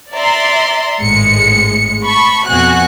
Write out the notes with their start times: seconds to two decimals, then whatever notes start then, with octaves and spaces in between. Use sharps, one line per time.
0.13 D5 E5 A#5 C6
1.01 G#1 A2 G#3 C#7
2.05 A5 B5 C#6
2.47 F2 B2 F#4 G#5 F#6